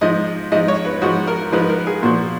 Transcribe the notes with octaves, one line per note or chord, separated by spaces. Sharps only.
G#2 F3 D#5
G#2 F3 D#5
C#5
B4
G#2 F3 F#4
A#4
G#2 F3 B4
A#4
G#4
A#2 F3 F#4